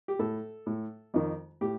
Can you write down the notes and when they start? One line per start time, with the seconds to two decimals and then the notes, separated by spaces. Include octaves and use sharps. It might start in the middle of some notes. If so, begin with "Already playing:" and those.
0.08 G4
0.19 A2 A4
0.66 A2
1.14 F2 D#3
1.61 A2 G4